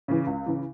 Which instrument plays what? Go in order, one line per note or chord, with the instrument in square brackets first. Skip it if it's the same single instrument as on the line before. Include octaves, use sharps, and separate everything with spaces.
[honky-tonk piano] C#3 E3
C#2
C#3 E3